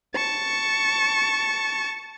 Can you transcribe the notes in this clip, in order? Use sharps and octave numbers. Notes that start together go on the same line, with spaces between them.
A5 C#6